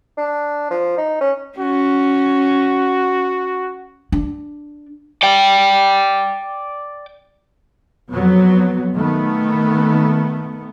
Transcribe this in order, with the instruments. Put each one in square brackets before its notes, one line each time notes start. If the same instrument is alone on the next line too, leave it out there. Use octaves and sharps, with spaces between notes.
[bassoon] D4
F3
D#4
C#4
[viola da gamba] C#4 [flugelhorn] F#4
[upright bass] D4
[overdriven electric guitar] D5 G5
[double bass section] F2 F#3 B3
D#3 A3 B3